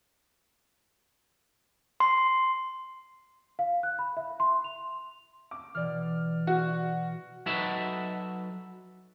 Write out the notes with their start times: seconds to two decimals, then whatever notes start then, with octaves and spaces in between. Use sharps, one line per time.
2.00 C6
3.59 F5
3.83 F#6
3.99 B5
4.17 E5
4.40 C6
4.64 F7
5.51 D6
5.75 B2 E3 D5 F6
6.47 F#4
7.46 F#3 D#4 F#4 A4 B4 E5